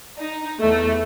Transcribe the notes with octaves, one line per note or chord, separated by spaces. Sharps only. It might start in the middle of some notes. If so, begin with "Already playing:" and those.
D#4
E2 A3